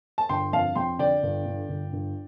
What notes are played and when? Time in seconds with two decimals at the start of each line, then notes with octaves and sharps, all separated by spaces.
0.18 A5
0.29 G1 G5 C6
0.53 F2 F5 A5
0.75 F2 G5 C6
0.99 D3 D5 G5
1.23 G1
1.46 D3
1.69 G1
1.92 G1